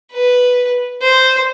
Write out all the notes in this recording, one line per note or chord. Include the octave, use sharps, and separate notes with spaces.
B4
C5